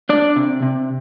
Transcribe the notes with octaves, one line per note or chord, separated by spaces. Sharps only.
D4 D5
C3
C3